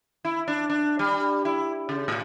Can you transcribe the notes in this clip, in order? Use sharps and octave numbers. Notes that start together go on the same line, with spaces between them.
E4
D4
D4
G3
E4
C#3
A2